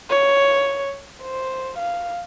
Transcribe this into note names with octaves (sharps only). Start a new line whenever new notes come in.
C#5
C5
F5